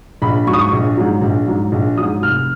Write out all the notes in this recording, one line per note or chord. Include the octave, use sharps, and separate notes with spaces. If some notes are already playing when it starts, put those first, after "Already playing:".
A#1 B5
G#2 F#3 C#6
D#6
C#6
A#1
G#2 F#3
A#1
G#2 F#3
A#1
G#2 F#3 D#6
F1 F6